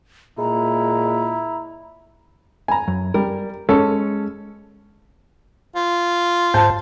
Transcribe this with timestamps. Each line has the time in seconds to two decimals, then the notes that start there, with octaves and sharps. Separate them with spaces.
0.38 A#2 G#3 E4 A#5
2.68 G#5 A#5
2.88 F#2
3.14 G3 A#4
3.69 G#3 C#4 A4
5.76 F4
6.54 G#2 C5 A5